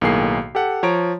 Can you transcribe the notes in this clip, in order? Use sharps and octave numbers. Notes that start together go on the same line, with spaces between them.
B1 A2 D#3 A#3 G#4 C7
G4 A4 F#5
F3 C#5 A#5 D7